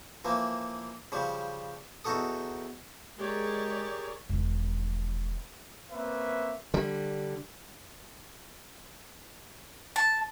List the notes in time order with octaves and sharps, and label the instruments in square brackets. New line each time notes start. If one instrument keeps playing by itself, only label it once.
[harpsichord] E3 F3 A#3
C#3 F3 G3
E2 D#4 F#4 A4 D#6
[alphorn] G#3 [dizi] G4 [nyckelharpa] G#4 A#4 [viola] C#5 D5
[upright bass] E1 D#3
[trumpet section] A#3 C4 C#4 B4 E5
[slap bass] D3 G3
[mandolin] A5